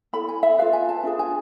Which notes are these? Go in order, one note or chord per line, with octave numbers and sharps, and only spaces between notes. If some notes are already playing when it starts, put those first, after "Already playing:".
E4 A4 B5
G#5
E5
F4 G#4 B4 F5
G#5
A5
D4 F4 G#4
G#5